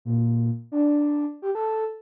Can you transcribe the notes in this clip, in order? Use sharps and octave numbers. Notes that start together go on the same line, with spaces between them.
A#2
D4
G4
A4